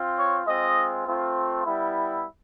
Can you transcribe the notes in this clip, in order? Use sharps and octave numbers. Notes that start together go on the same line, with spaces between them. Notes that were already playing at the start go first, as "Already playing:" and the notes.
Already playing: C4 F4
C#5
G#3 C4 F4 D#5
A3 C4 F4
G3 B3 E4